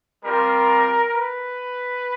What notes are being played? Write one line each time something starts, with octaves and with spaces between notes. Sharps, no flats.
G3 C4 F4 A#4
B4